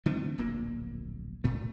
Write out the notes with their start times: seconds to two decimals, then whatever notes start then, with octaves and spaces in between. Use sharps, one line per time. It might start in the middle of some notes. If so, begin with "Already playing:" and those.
0.06 D3 A3 B3 C4
0.38 D1 A#1 A#2 A#3
1.44 A2 A3